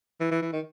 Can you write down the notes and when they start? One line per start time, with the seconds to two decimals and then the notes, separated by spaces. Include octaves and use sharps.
0.20 E3
0.31 E3
0.42 E3
0.53 D#3